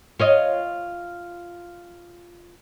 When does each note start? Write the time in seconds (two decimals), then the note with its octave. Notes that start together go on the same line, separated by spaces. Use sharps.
0.19 F4 C#5 D#5